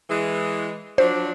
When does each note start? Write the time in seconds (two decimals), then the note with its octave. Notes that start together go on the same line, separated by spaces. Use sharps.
0.09 E3 G#3
0.98 F3 F#3 D4 C5